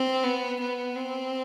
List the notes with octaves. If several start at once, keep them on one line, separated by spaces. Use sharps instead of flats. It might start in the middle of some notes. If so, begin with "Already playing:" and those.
Already playing: C4
B3
B3
C4